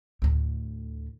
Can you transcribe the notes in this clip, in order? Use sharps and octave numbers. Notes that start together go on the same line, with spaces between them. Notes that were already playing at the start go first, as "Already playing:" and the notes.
D2 A2